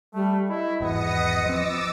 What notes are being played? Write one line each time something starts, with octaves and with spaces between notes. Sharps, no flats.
G3 A3
E4 D#5
G#1 E2 B3 D#6 A#6 C#7
F3 C4 D6 E6 A6